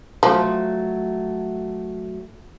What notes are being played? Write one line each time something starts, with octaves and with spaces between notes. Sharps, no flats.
F3 F#3 A3